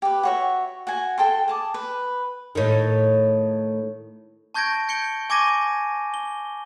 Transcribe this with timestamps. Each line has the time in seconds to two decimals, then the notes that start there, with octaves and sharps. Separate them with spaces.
0.02 G4 B4
0.23 F#4 C#5 E5
0.87 F#4 F#5 G#5
1.18 A4 G5 A5 C6
1.48 G#4 A5 D6
1.74 B4
2.55 A2 D#3
4.54 A5 C#6 G6 G#6 A#6 D7
4.89 G6 C#7 D7 G7
5.30 G#5 C#6 D6 G#6 A#6 D#7
6.14 G7